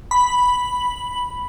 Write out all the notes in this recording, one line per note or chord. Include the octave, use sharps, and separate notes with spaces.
B5